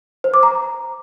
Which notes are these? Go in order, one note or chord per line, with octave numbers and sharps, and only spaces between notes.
C5
D6
A#5